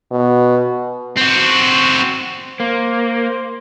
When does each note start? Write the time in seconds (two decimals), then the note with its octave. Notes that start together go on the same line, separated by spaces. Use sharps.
0.11 B2
1.17 C4 F#4
2.60 A#3 C5